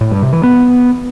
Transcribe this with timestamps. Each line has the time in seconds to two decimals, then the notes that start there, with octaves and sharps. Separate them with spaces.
0.01 A2
0.11 G2
0.22 C3
0.33 E3
0.43 B3